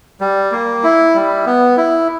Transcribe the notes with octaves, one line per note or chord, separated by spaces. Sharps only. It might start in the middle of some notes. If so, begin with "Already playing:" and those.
G3
A#3
E4
G3
B3
E4